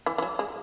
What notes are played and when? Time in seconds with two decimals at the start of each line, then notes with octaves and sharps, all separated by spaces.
0.06 E3
0.18 E3
0.22 F#3
0.39 G#3